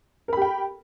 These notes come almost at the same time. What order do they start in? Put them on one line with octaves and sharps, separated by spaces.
A#4 B5 G4 G5